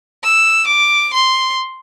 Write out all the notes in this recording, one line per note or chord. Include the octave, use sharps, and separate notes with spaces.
E6
D6
C6